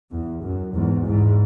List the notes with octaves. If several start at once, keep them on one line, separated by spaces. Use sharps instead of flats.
E2
F#2
E2 G#2
E2 G#2